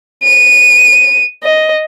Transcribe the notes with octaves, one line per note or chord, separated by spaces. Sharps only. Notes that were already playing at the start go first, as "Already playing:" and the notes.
D#7
D#5